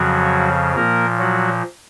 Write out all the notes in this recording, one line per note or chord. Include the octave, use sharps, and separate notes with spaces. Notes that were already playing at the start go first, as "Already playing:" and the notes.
Already playing: F2 C#3 F3 F#3 F#4
A#2 F3 A#3 A#4
F#3 F#4